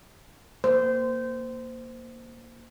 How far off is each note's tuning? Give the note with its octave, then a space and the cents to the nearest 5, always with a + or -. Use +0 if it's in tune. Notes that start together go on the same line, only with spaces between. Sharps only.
A#3 +0 C5 -20